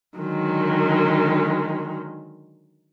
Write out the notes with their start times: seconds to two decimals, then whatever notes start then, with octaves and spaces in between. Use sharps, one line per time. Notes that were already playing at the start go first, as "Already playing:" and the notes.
0.18 D3 D#3 F#3 G#3